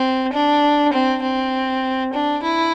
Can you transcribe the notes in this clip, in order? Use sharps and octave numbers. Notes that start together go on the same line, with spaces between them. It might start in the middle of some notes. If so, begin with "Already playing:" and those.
Already playing: C4
D4
C4
C4
D4
E4